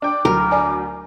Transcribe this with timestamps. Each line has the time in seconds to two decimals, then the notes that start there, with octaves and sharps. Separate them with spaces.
0.02 D4 G5 D6
0.25 D2 F#3 A#4
0.51 D5 G#5